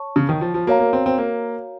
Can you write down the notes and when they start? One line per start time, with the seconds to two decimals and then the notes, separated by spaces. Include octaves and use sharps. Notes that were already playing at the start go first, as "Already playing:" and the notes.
Already playing: C#5 A5 C#6
0.16 C#3
0.29 D#3
0.41 F3
0.54 F3
0.67 A#3 F#4 A#4 C#5 F5 A#5
0.79 A#3
0.93 C4
1.06 C4
1.18 A#3